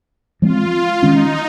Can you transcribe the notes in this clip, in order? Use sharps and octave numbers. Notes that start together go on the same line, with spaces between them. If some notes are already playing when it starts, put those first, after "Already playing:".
F3 G#3 C4 F4
D#3 G#3 C#4 D#4